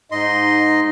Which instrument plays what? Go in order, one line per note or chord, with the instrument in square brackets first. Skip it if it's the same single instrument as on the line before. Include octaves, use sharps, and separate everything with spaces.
[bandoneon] G#2 D#5 C6 [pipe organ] D#4